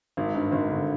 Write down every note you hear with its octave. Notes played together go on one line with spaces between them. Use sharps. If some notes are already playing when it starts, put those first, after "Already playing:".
G#1
G2
G#1
D3